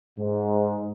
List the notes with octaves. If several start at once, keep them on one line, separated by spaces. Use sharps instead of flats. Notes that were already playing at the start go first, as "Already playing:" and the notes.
G#2